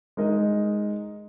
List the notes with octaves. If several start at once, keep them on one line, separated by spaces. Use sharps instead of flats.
G#3 D#4 A#4 D#5